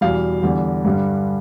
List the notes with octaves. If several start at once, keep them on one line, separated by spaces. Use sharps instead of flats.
E2 B2 G3 F5
E2 D3 G3
G2 D3 G3